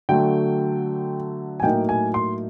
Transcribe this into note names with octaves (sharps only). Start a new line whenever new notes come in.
D3 F#3 A3 G5
G#5
A2 F#3 A#3 D#4 G5
G#5
C6